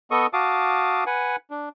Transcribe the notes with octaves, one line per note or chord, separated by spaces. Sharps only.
B3 A4 D#5 C#6 D#6
F#4 F5 A5 D6 D#6
B4 F#5 G#5
D4